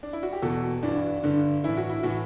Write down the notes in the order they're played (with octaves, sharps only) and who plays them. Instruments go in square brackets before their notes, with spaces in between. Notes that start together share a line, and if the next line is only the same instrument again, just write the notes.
[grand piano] D4
E4
F#4
G4
E2 B2 F#4 A4
G2 E3 D4 F#4
G2 D3
A2 E3 E4
F#4
E4
A2 E3 F#4